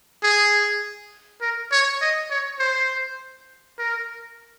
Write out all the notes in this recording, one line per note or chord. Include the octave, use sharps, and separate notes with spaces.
G#4
A#4
C#5
D#5
C#5
C5
A#4